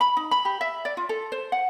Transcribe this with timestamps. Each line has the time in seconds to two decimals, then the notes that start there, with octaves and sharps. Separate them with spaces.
0.01 B5
0.17 D#4
0.31 B5
0.45 G4
0.61 E5
0.85 D5
0.97 F4
1.09 A4
1.32 C5
1.52 F#5